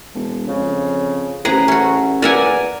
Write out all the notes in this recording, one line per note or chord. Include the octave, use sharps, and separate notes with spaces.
E1
F2 C#3
A1 C3 G#4 B4 A#5
A3 C#4 F#4
E2 A#4 D5 E5 F#5 G#5